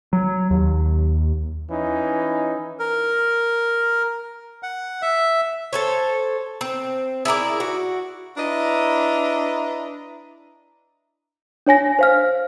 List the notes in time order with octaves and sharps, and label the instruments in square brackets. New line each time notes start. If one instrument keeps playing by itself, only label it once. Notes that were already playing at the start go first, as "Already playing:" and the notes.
[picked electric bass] F#3
D#2
[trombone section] E3 C#4 D#4
[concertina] A#4
F#5
E5
[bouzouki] A4 C5 C#5
C4
E4 G#4 A#4 D5
F#4
[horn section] D4 E4 B4 D#5 E5 A#5
[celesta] D4 C#5 G#5 A#6
C5 F5 F6